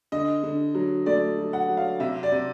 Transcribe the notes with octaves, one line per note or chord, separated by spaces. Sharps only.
D3 D#5
D3
F#3
A3 D5
F#3
F#5
F#3
F5
C3 E5
D5
C3